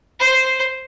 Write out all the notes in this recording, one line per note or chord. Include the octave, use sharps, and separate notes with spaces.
C5